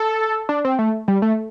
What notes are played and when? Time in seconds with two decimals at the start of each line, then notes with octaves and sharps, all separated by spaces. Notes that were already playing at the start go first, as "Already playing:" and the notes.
Already playing: A4
0.49 D4
0.65 C4
0.79 A3
1.08 G3
1.22 A3